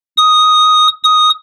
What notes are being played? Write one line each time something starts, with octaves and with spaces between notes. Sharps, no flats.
D#6
D#6